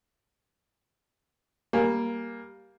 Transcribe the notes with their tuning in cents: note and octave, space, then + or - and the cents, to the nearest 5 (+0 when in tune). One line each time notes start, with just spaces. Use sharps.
G3 +0 A#3 +5 G#5 +0